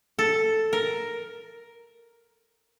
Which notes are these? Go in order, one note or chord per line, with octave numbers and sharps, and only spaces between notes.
A4
A#4